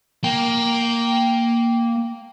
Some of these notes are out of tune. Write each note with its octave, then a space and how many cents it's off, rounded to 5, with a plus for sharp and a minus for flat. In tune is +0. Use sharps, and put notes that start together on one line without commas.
A#3 +0 G5 +0